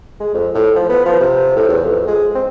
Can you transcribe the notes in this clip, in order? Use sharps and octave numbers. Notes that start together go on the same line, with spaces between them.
G#3
F2
A2
F3
B3
F3
C3
A2
E2
F2
G#3
C4